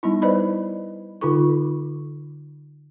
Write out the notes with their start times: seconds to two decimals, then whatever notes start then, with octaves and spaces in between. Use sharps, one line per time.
0.03 G3 B3 D#4 E4
0.22 B4 C5 D5 D#5 B5
1.21 D3 D#4 F4 A4 C#6